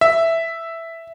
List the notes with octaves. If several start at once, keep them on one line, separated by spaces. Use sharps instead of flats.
E5